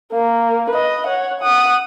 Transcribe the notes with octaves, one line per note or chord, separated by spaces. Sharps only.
A#3
B4 D#5
C#5 F#5
F#5 D#6